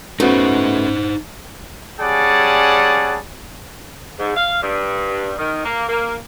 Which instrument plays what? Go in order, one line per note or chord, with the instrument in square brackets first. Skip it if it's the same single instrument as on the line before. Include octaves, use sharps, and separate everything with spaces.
[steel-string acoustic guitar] C#3 [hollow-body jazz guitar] A3 B3 F#4 [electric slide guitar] D#4 C5
[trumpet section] G3 C#4 G#4 D5 F#5 A5
[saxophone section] G#2
F5
G2
D#3
A#3
A#3